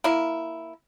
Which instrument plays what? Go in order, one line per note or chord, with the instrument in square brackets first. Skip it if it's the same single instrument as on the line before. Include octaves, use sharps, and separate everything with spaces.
[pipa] A#3 E4